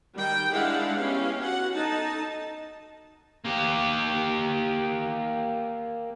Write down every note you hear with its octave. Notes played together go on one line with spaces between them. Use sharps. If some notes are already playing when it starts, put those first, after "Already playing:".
D#3 G3 G5
G#3 D4 E4 F5 F#5
B3 C#4 E4 G4 F5
F#4 F#5
D#4 A4 A5
A#3 G4